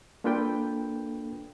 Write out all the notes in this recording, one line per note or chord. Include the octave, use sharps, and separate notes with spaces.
A#3 D4 F4 A4 B4 G5